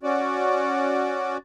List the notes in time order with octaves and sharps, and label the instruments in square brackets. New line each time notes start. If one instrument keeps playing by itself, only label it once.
[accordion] C#4 F#4 D5